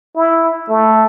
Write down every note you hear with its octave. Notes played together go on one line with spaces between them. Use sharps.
E4
A3